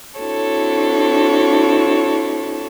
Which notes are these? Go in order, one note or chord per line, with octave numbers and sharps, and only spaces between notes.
C4 D4 E4 F#4 A4 C#5